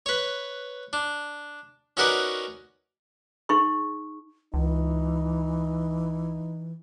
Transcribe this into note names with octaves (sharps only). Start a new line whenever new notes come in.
B4 C#5
D4
C#4 D#4 F#4 A#4 B4 D5
D#4 G#4 C6 C#6
C#2 E3 D#4